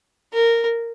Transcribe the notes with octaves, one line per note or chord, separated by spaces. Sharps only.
A#4